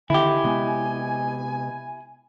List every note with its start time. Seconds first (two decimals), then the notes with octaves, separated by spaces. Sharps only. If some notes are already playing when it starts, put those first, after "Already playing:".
0.10 D3 D#3 E4 G4 G#5
0.44 C3 G#3 B3